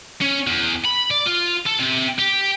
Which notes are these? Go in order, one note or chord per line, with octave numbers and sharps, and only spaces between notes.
C#4
E2
B5
D5
F4
A4
C3
G4